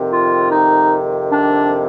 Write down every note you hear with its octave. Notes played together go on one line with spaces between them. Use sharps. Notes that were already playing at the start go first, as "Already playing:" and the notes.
Already playing: F2 C3 D#3
F4
D#4
D4